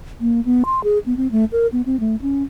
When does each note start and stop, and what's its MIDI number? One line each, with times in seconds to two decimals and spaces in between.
0.20 0.41 58
0.45 0.63 59
0.65 0.82 84
0.84 0.98 68
1.06 1.16 59
1.17 1.27 60
1.31 1.45 57
1.52 1.67 70
1.72 1.81 59
1.86 1.99 60
2.00 2.16 57
2.22 2.43 61